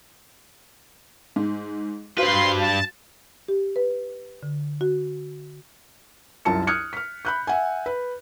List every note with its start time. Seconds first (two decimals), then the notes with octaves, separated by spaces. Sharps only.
1.36 G#2
2.18 G2 F#4 B4 C5 F5 C6
2.57 A5
3.48 G4
3.76 B4
4.43 D3
4.81 F#4
6.45 C2 F#2 F4 A5 C#7
6.67 D#6 F6 F#6 G#6 C#7
6.93 F6 B6
7.25 B5 F#6 G6
7.47 E5 F#5 G#5
7.86 B4